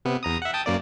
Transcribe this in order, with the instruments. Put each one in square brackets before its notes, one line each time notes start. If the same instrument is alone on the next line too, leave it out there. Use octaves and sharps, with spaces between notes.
[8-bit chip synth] C3 B3
E2 A#5 D#6
E5 F#5
G5 A5 D#6
F#2 A#3 D5